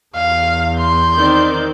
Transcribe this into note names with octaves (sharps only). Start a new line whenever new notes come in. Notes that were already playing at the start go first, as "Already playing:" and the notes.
E2 F5
C6 G6
D#3 C4 D5